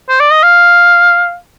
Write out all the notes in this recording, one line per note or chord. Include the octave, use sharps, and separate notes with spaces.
C5
D5
D#5
F5